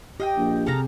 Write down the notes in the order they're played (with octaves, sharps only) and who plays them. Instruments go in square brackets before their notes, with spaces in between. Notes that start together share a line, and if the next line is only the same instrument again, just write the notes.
[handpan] G4 [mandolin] D#5 F5 G5
[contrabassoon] A#1
[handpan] C3 G#4 [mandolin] A4 F5 A#5